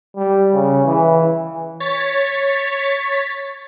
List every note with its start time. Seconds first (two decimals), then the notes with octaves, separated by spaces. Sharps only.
0.16 G3
0.54 C#3
0.85 E3
1.80 C#5 A6 B6